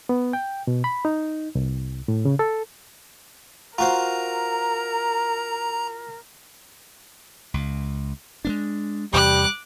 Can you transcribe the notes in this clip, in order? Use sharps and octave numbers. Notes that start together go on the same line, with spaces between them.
B3
G5
B2
B5
D#4
C2
A2
C#3
A4
F4 F#4 A#4 C5 A#5
C#2
G#3 A#3 D4
E2 C3 G3 D6 F#6